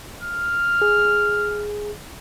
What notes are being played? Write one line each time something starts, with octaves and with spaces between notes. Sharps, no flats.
F6
G#4